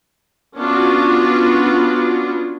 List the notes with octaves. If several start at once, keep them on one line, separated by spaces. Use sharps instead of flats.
B3 C#4 D4 F4 F#4